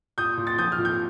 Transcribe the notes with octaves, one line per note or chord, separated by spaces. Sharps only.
A#2 D#6 G6
A#2
A6
F3 D#6 G6
F6
A#2
G6